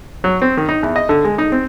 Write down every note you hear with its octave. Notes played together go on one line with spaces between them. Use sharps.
F#3
C4
D#3
D#4
E2
D#5
D3
G#3
D#4
C4